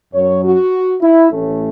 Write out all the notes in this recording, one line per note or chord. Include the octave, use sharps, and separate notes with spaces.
F#2 F#3 C#4 C#5
F#4
E4
A1 A2 A3 C#4